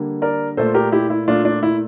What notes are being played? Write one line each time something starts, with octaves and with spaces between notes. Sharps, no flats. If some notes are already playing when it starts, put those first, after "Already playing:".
Already playing: D3 G3 A#3
A#4 D5
A#2 A3 A4 C5
G4 A#4
E4 G4
E4
A#2 A3 D4 F4
D4
E4